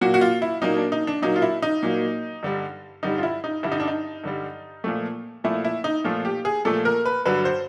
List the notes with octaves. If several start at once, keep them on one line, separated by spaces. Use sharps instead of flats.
A#2 F#3 A#3 F#4
F#4
F4
E4
A#2 F#3 A#3 D#4
D4
D#4
D4
A#2 F#3 A#3 D#4
F4
E4
D#4
A#2 F#3 A#3
G2 D3 G3
G2 D3 G3 D#4
F4
E4
D#4
G2 D3 G3 E4
D#4
D4
D#4
G2 D3 G3
A#2 F3 A3
A#2 F3 A3 E4
E4
D#4
A#2 F3 A3 F4
G4
G#4
A#2 F3 A3 A4
A#4
B4
G2 D3 F#3 B4
C5